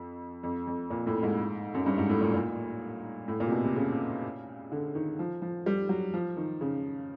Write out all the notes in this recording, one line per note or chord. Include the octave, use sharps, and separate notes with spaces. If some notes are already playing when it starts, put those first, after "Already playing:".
Already playing: F2
F2
F2
A#2
A2
G#2
F#2
G2
G#2
A2
A#2
A#2
A2
A#2
C3
B2
C3
C#3
D3
D#3
F3
F3
G3
F#3
F3
D#3
C#3